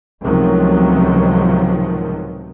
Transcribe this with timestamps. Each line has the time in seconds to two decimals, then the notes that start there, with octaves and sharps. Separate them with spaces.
0.22 C#2 A2 C3 D#3 F3 F#3